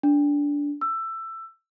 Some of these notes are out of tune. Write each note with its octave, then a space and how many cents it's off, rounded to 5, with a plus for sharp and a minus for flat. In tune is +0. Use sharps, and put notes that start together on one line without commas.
D4 -20
E6 +15